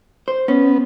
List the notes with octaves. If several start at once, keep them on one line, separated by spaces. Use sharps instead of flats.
C5
B3 C#4